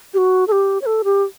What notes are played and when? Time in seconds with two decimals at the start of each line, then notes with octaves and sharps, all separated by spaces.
0.14 G4
0.18 F#4
0.48 A4
0.52 G4
0.82 C#5
0.86 A4
1.04 G4